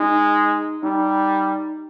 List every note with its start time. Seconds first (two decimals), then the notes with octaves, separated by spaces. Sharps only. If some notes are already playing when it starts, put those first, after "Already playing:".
Already playing: G#3 D#4
0.83 G3 D#4